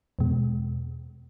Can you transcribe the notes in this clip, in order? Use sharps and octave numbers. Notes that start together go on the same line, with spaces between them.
E2 B2 G#3